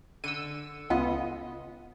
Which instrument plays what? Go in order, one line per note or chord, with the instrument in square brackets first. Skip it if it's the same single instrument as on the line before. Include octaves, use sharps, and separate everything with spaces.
[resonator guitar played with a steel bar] D3 [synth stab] E6 D#7
[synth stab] C#2 B3 F4 [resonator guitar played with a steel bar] D#5